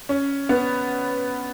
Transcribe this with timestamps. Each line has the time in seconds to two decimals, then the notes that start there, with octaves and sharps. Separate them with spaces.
0.09 C#4
0.49 B3